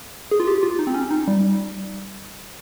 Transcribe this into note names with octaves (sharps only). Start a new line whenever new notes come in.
G#4
F4
G4
F4
D#4
C4
C#4
D#4
G3